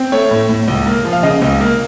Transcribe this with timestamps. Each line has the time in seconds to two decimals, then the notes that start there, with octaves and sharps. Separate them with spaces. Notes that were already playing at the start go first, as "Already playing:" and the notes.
Already playing: C4
0.12 A3 C#5
0.31 A2
0.49 A2
0.68 C#2
0.86 A#3
1.05 F3
1.13 F5
1.23 C#3 D#5
1.42 C#2
1.60 A#3